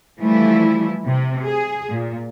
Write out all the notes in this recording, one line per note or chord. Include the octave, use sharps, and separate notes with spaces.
E3 F3 G3 A3 E4
C3
G#4
A#2